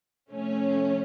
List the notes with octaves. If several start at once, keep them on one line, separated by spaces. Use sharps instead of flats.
C3 F3 A3 C#4